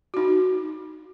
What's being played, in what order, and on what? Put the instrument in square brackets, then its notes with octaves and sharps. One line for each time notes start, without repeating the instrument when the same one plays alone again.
[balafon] D#4 F#4